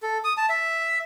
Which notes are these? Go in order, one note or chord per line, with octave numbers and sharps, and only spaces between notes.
A4
D#6
A5
E5